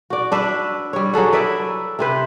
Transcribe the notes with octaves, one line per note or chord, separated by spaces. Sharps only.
F#4 D5
D4 B4 E5
G3 C#5
F#3 G#4 A4 F#5
E4 B4 D5 E5
C3 C4 B4